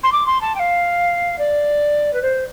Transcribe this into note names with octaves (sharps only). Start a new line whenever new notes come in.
C6
D6
C6
A5
G5
F5
D5
B4
C5